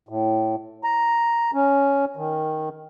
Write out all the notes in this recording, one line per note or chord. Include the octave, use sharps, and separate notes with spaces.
A2
A#5
C#4
D#3